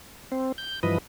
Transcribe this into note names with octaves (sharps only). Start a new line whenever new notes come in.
C4
G6
G2 E3 F3 B4 D#5